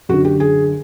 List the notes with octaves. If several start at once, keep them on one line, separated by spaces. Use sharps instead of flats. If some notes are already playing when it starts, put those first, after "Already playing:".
F#2 D3 F#4
G4
G#4